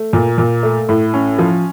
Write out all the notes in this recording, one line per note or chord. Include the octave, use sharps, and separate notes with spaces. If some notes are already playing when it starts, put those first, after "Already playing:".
Already playing: A3
A#2
A#2
A3
A2
C#4
F3